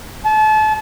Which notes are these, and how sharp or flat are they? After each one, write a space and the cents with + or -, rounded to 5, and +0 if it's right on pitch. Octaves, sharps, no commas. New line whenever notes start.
A5 -30